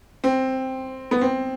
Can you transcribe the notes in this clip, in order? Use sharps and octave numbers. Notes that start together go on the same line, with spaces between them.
C4
B3
C4